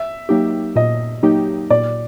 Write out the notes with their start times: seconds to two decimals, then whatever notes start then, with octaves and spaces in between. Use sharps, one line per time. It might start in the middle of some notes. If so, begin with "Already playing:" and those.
Already playing: E5
0.29 F#3 A#3 D#4 G4
0.76 A#2 D#5
1.23 F#3 A#3 D#4 G4
1.70 A#2 D5